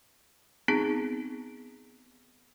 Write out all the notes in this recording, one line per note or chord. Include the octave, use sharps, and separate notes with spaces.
B3 C4 D#4 G#4